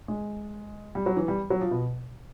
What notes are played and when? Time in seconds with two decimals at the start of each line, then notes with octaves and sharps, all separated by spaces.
0.08 G#3
0.95 G3
1.06 F#3
1.17 E3
1.28 G3
1.50 F#3
1.61 F3
1.71 B2